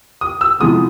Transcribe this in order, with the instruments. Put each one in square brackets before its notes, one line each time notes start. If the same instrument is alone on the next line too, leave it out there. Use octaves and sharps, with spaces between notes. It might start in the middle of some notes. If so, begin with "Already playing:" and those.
[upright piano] D#6
E6
F2 C3 E3 G#3 B3 D#6